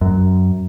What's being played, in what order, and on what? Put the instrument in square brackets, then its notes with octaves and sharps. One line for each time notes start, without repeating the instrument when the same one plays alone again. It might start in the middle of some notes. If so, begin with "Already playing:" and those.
[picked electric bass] F#2